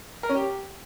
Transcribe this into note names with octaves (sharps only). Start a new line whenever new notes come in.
A#4
C#4
G4